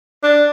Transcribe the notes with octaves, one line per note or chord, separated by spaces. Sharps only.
D4